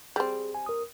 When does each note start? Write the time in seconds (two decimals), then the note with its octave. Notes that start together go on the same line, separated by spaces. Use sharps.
0.16 G3 C4 G#4
0.55 G#5
0.66 A#4 D#6